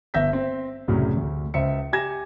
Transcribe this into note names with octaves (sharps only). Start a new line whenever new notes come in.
G1 B3 E5 G6 A#6 B6
C4
C2 F#2 A2 C#3
D2
C#2 C5 E5 C#7
G4 G#5 G#6 A#6 E7